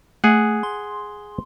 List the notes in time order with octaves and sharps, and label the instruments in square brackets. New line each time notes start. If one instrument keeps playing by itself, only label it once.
[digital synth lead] A3 [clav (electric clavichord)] G#4 F#5
[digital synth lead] C6